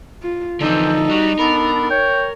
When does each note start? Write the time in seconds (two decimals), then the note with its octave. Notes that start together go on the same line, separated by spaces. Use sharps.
0.23 F4
0.61 D3 E3 F3 C4 D#4 A4
1.09 G3 F#4
1.39 B3 D4 A4 A#4 B5
1.90 C#5 G5